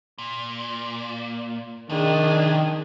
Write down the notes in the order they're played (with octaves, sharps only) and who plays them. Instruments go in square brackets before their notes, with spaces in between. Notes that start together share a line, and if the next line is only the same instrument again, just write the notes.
[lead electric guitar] A#2
[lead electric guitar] F2 C3 [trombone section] D#3 [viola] D4 G#4